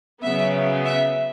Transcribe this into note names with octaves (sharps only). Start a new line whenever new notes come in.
C#3 F#3 B3 E5
E5